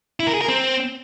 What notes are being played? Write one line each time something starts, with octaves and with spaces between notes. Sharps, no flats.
E4
A#4
G#4
A#4
C4